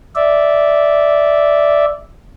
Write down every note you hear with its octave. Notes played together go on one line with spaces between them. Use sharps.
D5 E5